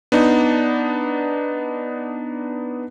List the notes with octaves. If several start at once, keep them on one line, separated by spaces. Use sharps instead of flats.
B3 D4 D#4